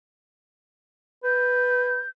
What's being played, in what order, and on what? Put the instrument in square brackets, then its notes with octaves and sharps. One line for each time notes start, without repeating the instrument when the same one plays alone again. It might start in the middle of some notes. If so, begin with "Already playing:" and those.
[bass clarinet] B4 [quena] G6